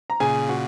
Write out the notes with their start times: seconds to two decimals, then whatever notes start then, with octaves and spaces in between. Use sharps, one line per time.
0.10 A#5
0.20 A#2 C#3 G#4 G#5
0.49 F#4 F#5